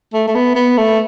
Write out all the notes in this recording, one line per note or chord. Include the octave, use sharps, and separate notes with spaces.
A3
A3
B3
B3
A3